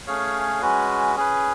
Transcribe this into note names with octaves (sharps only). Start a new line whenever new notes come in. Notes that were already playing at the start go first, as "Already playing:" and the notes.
A3 C#4 G#4 C#5 F5
G#3 C#4 F#4 B4
C#4 G#4 B4